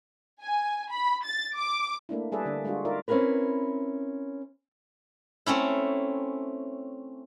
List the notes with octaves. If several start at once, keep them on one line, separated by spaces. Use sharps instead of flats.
G#5
B5
A6
D6
A3 A#3 D4 E4
G3 G#4 A4 B4 D5 E5
D3 D4
G3 G#3 D4 F4 F#4
D#4 F4 A#4 D5 E5
C4 C#4 E4 G#4 A#4 B4
A3 C4 C#4 E4